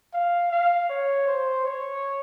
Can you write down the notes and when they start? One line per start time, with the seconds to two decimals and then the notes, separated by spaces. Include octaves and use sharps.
0.13 F5
0.52 F5
0.89 C#5
1.27 C5
1.65 C#5